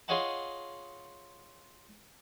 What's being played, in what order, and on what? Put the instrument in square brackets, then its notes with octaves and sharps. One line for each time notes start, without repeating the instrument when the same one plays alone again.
[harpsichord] F4 G#4 C#5 D#5 F#5 A5